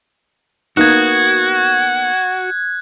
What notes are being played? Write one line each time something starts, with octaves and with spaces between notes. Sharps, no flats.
A#3 B3 D#4 F#4 F#6 G#6